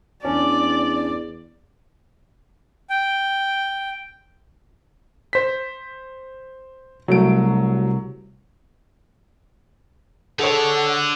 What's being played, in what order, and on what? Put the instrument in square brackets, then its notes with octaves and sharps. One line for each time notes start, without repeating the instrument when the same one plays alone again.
[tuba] E2 [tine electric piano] C#4 D4 [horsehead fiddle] D5
[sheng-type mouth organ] G5
[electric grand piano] C5 B6
[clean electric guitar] C2 [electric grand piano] F#3 A3 D7
[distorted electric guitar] D3 [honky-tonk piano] G#4 C#5 [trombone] A4 [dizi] F#5